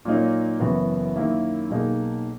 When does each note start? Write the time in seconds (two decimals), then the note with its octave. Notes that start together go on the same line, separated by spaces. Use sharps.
0.05 A#2 F#3 A#3 D#4
0.60 F#1 F#2 E3 B3 F#4
1.16 F#2 D#3 A#3 E4
1.70 B1 B2 A#3 D#4 G#4